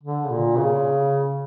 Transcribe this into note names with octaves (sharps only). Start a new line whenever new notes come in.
D3
C#3
A#2
C#3